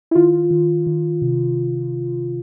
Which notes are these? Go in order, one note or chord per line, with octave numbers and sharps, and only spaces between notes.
E4
D#3 F4
D#3
D#3
C3